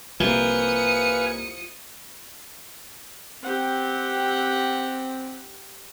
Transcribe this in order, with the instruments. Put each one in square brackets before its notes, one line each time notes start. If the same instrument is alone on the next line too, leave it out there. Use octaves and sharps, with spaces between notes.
[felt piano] C2 A#3 [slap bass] F3 [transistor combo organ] B4 F5 G#5 [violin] D#6 C#7
[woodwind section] C4 [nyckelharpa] G4 F#5